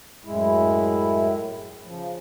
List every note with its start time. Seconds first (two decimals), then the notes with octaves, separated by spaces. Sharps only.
0.25 F#2 A2 G#3 E4
1.84 C#3 F3